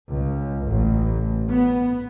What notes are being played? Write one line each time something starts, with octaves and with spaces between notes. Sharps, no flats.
C#2
A1
B3